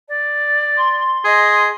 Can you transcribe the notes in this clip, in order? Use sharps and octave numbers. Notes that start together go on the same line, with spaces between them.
D5
C6
G#4 D#5